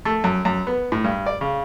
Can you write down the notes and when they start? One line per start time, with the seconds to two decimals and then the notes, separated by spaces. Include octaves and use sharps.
0.05 A3
0.24 F#2
0.45 F#2
0.67 B3
0.92 A2
1.04 G2
1.26 D5
1.41 C#3